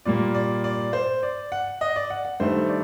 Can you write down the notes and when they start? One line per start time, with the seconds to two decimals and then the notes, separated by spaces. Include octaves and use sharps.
0.05 A#2 G3 A#3 D5
0.35 D5
0.64 D5
0.93 C5
1.23 D5
1.52 F#5
1.81 D#5
1.96 D5
2.10 F#5
2.25 F#5
2.40 G2 D#3 A3 C5
2.69 D5